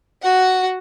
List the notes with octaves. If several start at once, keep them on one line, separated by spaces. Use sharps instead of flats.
F#4 F#5